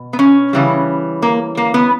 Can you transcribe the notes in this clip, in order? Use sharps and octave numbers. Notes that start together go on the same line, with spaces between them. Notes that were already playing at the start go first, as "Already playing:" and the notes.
Already playing: B2
B3
C#4
C#3 E3 G3
A#3
A#3
B3